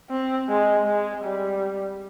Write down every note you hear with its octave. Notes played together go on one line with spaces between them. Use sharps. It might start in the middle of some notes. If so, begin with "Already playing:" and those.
C4
G#3
G#3
G3